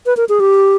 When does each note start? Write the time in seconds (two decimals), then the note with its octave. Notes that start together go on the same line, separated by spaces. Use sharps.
0.06 B4
0.17 A#4
0.29 G#4
0.40 G4